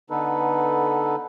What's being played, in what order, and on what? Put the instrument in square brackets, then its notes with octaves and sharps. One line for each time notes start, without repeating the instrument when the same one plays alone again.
[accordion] D3 B3 D#4 A4 B4